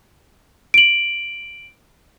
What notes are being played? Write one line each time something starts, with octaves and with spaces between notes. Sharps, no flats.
D7 F#7